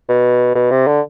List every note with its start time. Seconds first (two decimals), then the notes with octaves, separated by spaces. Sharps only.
0.09 B2
0.55 B2
0.71 C3
0.87 D3